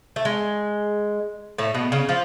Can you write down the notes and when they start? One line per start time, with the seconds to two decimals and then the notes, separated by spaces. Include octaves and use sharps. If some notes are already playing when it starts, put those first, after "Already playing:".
0.16 A3
0.25 G#3
1.58 A2 A3
1.74 B2 B3
1.92 C#3 C#4
2.09 F3 F4